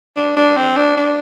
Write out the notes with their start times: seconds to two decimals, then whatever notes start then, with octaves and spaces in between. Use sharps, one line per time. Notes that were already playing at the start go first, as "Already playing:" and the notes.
0.16 D4
0.36 D4
0.57 C4
0.77 D4
0.97 D4